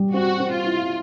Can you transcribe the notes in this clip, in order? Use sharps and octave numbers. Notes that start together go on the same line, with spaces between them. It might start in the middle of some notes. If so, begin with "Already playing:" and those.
Already playing: G3
C4 F#4
C4
F4
E4